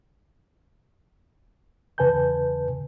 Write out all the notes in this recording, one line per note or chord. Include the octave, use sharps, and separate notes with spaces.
E2 C#3 B4 G#5 A5 G6